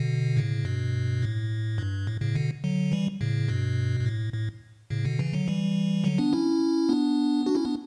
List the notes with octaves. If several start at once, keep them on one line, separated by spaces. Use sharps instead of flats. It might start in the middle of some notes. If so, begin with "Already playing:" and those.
Already playing: B2 D3
A2 C#3
G2 B2
A2
G2
A2
A2 C#3
B2 D3
D3 F#3
E3 G3
A2 C#3
G2 B2
G2
A2
A2
A2 C#3
B2 D3
C#3 E3
D3 F#3
E3 G3
D3 F#3
B3 D4
C#4 E4
B3 D4
D4 F#4
C#4 E4
B3 D4